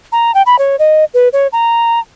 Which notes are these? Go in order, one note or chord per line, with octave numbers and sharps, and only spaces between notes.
A#5
G5
B5
C#5
D#5
B4
C#5
A#5